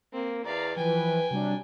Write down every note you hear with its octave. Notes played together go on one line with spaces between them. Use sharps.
A#3 C4
E2 D5 F5 A#5
E3 F3 B4 G5 G#5
C3 F#3 G3 D4